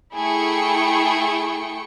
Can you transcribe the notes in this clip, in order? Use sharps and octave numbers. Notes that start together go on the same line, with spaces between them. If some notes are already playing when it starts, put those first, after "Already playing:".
A3 E4 G#4 G5 C#6 C#7